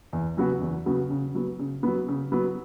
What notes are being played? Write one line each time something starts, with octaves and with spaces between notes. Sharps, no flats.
E2
C#3 F#3 B3 F#4
E2
C#3 F#3 B3 F#4
C#3
F#3 B3
C#3
F#3 B3
C#3
F#3 B3